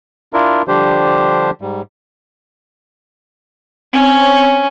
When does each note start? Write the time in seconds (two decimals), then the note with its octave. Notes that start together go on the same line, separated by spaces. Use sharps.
0.33 D4 E4 F4 A#4
0.68 D3 F3 G3 D4 G4 C5
1.61 G#2 G3
3.93 C4 C#4 C#5